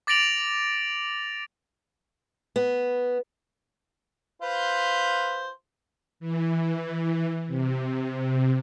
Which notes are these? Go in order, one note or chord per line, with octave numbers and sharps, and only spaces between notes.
D6 A6 A#6 D7 F7 F#7
B3
F4 B4 C5
E3
C3